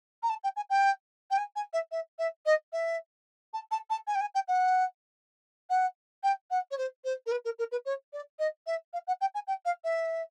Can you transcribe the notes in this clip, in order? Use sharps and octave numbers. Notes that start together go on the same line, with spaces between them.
A#5
A5
G5
G#5
G5
G5
G#5
G#5
E5
E5
E5
D#5
E5
A5
A5
A5
G#5
G5
G#5
G5
F#5
F#5
G5
F#5
C#5
C5
C5
A#4
B4
A#4
A#4
B4
C#5
D5
D#5
E5
F5
F#5
G5
G#5
G5
F5
E5